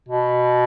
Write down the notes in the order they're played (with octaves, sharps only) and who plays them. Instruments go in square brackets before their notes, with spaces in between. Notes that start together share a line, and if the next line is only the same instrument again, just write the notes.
[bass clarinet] B2